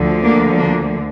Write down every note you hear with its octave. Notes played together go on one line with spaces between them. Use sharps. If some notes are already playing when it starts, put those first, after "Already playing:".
Already playing: D2 D3 F3
A#3 D4
A#3 D4